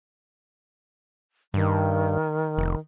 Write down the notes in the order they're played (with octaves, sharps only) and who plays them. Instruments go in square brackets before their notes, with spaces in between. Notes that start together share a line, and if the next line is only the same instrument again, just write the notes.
[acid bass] G2 [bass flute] D#3
[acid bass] F1